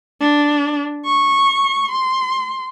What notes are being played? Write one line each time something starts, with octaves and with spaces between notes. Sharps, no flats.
D4
C#6
C6